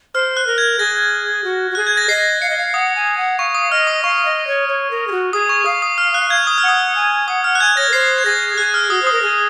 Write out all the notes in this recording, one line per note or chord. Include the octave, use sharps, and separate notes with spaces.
C5 F6
F#6
A#4
G#6
G#4 A#6
F#4
F#4
G#4 F#6
G#6
A#6
D#5 C7
F5 C#7
D#5
F5
F#5 D#6
G#5
F#5
F5 C#6
D#6
D#5 F6
D#6
F5 C#6
D#5
C#5
C#5
A#4
G#4
F#4
G#4 D#6
C#6
F5 D#6
D#6
F6
F#6
G#6
D#6
F6
F#5
D#6
G#5
F#5 D#6
F#5 F6
F#6
G#5 G#6
C#5 A#6
A#4
C5 C7
G#6
G#4 A#6
G#4 F#6
F6
F#4 D#6
C5 D#6
A#4
G#4